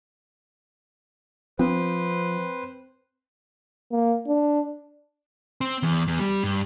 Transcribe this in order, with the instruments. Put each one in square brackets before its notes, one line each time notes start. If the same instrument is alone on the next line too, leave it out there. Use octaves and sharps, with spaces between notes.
[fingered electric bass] F3 [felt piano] C4 [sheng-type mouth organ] B4 C5
[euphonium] A#3
D4
[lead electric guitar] C4
E2
E2
G3
G2